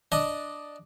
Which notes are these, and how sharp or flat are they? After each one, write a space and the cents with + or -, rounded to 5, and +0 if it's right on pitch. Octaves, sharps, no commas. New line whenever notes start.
D4 +5 D#5 +0